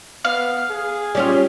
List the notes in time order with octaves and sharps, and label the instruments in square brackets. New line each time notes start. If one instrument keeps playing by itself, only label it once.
[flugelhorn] B3 [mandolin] F5
[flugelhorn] G#4
[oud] G3 C#4 F4